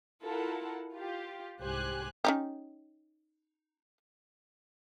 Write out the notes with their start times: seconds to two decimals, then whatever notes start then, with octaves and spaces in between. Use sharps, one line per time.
0.23 E4 F4 A4 A#4 F#5 A5
0.94 F4 G4
1.61 C2 G#2 G4 C5 G#5 F#6
2.25 C#4 D#4 G4